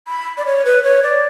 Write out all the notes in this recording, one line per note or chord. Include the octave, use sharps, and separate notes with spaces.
B5
D5
C#5
B4
C#5
D5